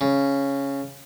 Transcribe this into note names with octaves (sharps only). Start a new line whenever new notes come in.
C#3